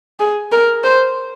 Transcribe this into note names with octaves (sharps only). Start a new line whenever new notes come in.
G#4
A#4
C5